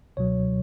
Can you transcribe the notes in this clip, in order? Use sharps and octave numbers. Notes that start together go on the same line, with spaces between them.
C#2 B2 F#3 C#5